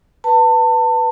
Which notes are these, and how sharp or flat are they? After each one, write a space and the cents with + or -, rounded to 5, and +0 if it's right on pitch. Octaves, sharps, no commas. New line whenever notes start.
B4 +0 A5 +30